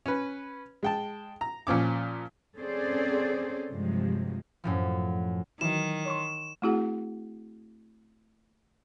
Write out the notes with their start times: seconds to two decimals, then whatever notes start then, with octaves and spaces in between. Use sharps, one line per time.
0.06 C#4 B4
0.83 G#3 G5 A5
1.41 A#5
1.67 A#2 F3 C#4 D6
2.56 C4 C#4 G#4 A4 C5 D5
3.71 G2 C3 F3 F#3 G#3
4.64 F#2 A2 F3
5.61 D#3 E3 F#3 E4 E7
6.05 C#5 C6 C#6
6.62 A3 C4 E4 F#4 G#4 F#5